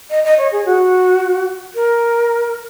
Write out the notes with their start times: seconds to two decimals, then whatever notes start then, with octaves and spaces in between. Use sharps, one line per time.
0.10 D#5
0.25 D#5
0.38 C#5
0.52 G#4
0.66 F#4
1.75 A#4